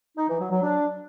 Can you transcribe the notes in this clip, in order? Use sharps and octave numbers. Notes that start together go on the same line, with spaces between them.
D#4
E3
F#3
F#3
D4